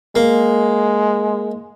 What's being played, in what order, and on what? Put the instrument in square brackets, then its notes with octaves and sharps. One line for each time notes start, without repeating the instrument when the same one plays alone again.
[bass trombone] G#3 [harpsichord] A#3